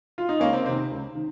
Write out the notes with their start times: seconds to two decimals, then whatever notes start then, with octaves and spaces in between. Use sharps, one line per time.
0.18 F4
0.29 D#4
0.40 C#2 A#3 C#4
0.53 C4
0.65 C3 C4
0.69 D#3
0.90 C#2
1.15 D#3